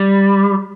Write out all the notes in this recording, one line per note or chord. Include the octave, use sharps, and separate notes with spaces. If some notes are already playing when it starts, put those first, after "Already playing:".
Already playing: G3